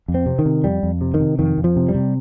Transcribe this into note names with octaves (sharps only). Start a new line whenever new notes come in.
F2
C4
C3
D#3
C3
F2 G3
F2
C3
D#3
C3
F2 D#3
F2
F3
C3
G3
C3